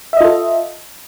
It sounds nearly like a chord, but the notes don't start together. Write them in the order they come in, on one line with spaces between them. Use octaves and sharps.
E5 D#5 F4 A4